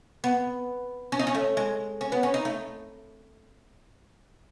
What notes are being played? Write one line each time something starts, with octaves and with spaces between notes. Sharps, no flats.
B3
C#4
D#4
C#4
A3
G#3
C#4
B3
C#4
D#4
A3